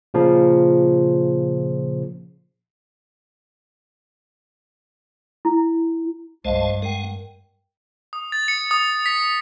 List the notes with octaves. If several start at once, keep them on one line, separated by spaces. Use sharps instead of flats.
A#2 C#3 F3
E4
C2 G2 G#3 C5 D#5 F5 A5
G#3 A#4 F#5 G5
D#6
A6
C#7
D#6
B6